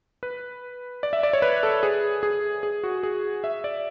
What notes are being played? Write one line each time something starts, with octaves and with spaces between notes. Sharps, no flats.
B4
D5
E5
D5
C#5
B4
A4
G#4
G#4
G#4
F#4
G#4
E5
D5